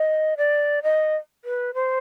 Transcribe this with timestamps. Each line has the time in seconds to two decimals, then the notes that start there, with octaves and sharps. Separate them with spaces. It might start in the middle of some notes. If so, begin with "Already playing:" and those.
Already playing: D#5
0.37 D5
0.83 D#5
1.45 B4
1.74 C5